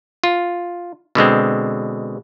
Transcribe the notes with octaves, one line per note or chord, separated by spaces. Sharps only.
F4
B2 D3 G#3 C4